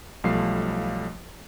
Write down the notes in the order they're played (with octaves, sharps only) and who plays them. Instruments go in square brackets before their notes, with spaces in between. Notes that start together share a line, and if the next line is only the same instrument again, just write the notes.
[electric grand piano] B1 F3 G3 A3 F5 C7